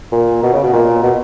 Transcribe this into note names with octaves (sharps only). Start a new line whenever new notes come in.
A#2
B2
C#3
B2
A#2
B2